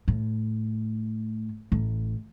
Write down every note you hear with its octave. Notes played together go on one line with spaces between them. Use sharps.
A2
A1